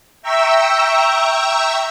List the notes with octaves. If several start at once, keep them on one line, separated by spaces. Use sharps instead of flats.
E5 G5 A#5 C#6 E6